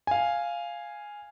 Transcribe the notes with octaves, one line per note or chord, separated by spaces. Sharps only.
F5 G#5